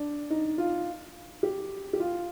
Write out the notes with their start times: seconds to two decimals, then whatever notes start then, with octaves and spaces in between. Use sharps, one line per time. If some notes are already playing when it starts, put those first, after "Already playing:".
Already playing: D4
0.30 D#4
0.58 F4
1.43 G4
1.93 G4
2.00 F4